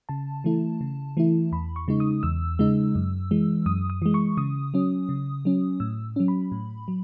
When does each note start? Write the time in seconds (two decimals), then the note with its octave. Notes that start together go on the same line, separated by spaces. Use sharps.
0.09 C#3 A5
0.44 E3 A3 E4
0.81 C#3
1.17 E3 A3 E4
1.52 E2 B5
1.76 C#6
1.88 C#3 G#3 D#4
2.00 D#6
2.23 E2 E6
2.59 C#3 G#3 D#4
2.95 F#2
3.31 E3 G#3
3.66 F#2 D#6
3.90 D#6
4.02 E3 G#3
4.14 C#6
4.37 C#3 D#6
4.74 F#3 C#4
5.09 C#3
5.45 F#3 C#4
5.80 A2 E6
6.16 F#3 C#4
6.28 B5
6.52 A2
6.88 F#3